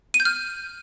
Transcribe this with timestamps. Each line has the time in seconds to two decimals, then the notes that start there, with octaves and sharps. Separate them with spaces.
0.14 D#7
0.20 G6
0.25 F6